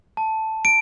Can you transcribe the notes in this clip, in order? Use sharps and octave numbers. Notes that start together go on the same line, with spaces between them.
A5
D7